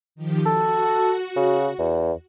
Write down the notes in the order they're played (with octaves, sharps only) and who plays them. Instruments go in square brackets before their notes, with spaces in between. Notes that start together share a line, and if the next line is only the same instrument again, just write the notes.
[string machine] D#3 F3 G4
[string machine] F#4 [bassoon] A4
[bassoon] C#3
E2